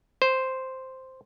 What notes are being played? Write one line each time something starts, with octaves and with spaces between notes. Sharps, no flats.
C5